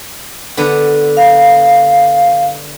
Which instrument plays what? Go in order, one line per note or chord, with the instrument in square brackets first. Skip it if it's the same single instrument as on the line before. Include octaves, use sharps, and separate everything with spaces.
[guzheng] D3 B3
[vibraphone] F5